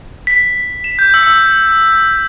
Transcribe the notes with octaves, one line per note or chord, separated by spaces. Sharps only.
B6
E7
G6
E6